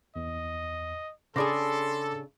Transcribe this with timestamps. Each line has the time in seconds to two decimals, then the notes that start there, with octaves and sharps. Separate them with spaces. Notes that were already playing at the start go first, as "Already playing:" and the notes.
0.16 E2 D#5
1.36 C#3 D4 G#4 A4 B5 C6 D6 A#6